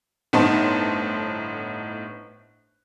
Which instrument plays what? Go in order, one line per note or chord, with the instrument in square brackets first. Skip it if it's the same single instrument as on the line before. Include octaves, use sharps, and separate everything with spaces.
[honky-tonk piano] G1 A2 B3 D#4 C5 A5